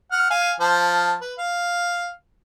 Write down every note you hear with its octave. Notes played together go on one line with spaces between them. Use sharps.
F#5 F6
F5 G#5
F3 C5 A5
B4
F5